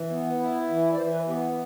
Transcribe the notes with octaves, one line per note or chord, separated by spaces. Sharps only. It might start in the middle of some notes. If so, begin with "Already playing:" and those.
Already playing: E3
B3
E4
E3
D5
E3 C5
B4
B3 G4